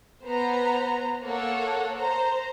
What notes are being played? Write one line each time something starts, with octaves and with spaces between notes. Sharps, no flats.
B3 C5 A#5
A#3 A4 C#5 F#5
C5 A#5